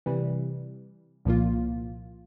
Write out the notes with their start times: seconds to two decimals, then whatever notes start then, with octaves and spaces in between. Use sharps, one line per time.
0.06 C3 E3 G3
1.25 C2 A#2 F3 A#3 F4